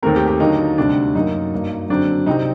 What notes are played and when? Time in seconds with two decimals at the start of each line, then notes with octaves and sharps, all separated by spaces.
0.02 D#2 D#3 A3 C4 A#4
0.16 G4
0.28 G4
0.40 D#2 D3 F#3 A#3 D#4
0.78 D2 C3 G3 D4
1.15 F#2 F#3 A#3 D#4
1.53 G2 F#3 A#3
1.90 F#1 F#2 D3 F#3 C4 D4
2.26 C2 C3 G3 C4 D#4